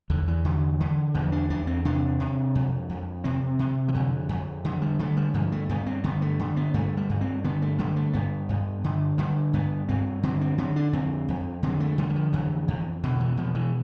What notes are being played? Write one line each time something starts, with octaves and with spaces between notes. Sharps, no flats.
E2 D3
E3
D3
D3
E2 F3
D4
E2 D4
C4
C3 D4
C3
F2
F2
C3 C4
C3
E3
F2 D3
F2
D3 E3
G3
D3 A3
G3
G2 F3
A3
G2 B3
C4
D3 B3
A3
D3
B3
G2 A3
G3
G2
C4
D3 B3
A3
D3 G3
A3
G2 B3
G2
D3
D3 G3
G2 B3
G2 C4
D3 C4
C4
D3 C4
D4
F2 C4
F2
D3 C4
A3
D3 G3
G3
F3
F2 E3
F2
B2 D3
E3
B2 F3
E3